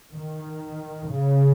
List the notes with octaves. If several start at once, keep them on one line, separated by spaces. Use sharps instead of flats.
D#3
C#3